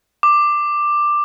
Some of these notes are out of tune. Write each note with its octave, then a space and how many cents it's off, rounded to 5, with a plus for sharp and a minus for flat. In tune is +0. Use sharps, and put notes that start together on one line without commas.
D6 +10